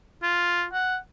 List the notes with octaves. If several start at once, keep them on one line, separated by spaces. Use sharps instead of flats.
F4
F#5